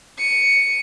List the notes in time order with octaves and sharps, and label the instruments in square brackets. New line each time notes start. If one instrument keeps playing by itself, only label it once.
[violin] C#7 D#7